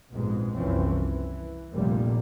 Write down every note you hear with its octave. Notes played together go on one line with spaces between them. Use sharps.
A#1 F2 G#2 B2 G#3
F#1 C2 E3 F3 C4 C#4
E3
F1 A#1 A#2 G3 A#3